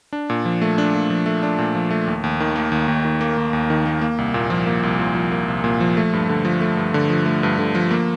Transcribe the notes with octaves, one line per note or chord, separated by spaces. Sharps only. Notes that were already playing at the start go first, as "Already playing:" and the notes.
D4
A#2
F3
A3
D4
A#2
F3
A3
D4
A#2
F3
A3
D#2
D#2
D#3
A#3
D#2
D#2
D#3
A#3
D#2
D#2
D#3
A#3
A#3
C2
A#2
F3
A#3
C2
A#2
F3
A#3
C2
A#2
F3
A3
G2
D3
F3
A3
G2
D3
F3
A3
G2
D3
F3
A#3